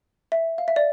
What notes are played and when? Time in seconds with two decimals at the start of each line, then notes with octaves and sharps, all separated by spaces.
0.32 E5
0.58 F5
0.68 E5
0.76 D5